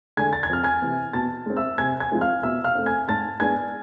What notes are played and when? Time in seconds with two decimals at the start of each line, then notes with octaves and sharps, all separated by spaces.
0.17 D3 G#3 D4 G#5 G#6
0.33 A6
0.43 G#6
0.49 F2 F6
0.63 G#5 G#6
0.82 C3 E3
1.13 B2 A5 A6
1.46 G#3 C4
1.57 E5 E6
1.78 C3 G#5 G#6
2.00 G#5 G#6
2.12 F3 G#3 C4
2.21 F5 F6
2.43 B2 E5 E6
2.64 F5 F6
2.75 A3 C4
2.86 G#5 G#6
3.08 G#2 A5 A6
3.40 G#3 B3 D4 G#5 G#6